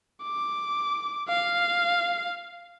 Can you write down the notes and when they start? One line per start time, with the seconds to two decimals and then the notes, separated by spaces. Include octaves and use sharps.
0.24 D6
1.28 F5